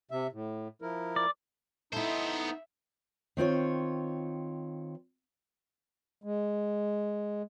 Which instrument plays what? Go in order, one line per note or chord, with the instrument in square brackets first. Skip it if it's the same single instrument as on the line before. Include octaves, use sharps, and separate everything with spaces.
[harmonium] C3 E5
A2
F3 E4 A#4
[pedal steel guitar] D5
[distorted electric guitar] B3 C5 [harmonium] D#4 [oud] E4 A4 [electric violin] E5
[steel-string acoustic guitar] D#3 C4 F4 C#5
[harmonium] G#3